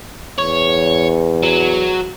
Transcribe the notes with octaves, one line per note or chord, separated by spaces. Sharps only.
E2 C#5
F#3